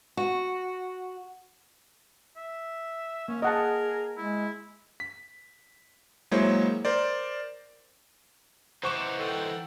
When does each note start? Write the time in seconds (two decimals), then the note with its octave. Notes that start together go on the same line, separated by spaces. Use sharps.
0.17 F#4
2.37 E5
3.28 A#3 C#4
3.42 G#4 A#4 D#5 F#5 A5
4.17 G#3 E4
5.00 B6
6.31 F#3 G#3 A#3 E4 C5 C#5
6.85 A#4 C5 D5
8.83 E3 D#4 C5 F#5 C#6 D6 E7
9.19 A4 F#5 G5